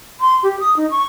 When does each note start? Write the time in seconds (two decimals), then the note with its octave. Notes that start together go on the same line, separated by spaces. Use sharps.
0.20 C6
0.43 G4
0.60 D#6
0.77 D#4
0.91 C#6